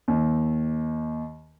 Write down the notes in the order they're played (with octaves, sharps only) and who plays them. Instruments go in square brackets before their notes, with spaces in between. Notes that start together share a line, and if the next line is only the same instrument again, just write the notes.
[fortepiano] D#2